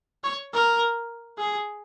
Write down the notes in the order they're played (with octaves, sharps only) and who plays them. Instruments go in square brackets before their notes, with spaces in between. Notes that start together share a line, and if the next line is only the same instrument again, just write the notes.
[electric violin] C#5
A#4
G#4